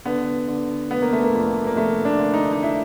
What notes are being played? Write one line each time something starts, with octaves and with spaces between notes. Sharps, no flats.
D3 B3
D3
F1 B3
A#3
A3
A#3
F2
A#3
F1 A3
D4
D3
D#4
D#4
E4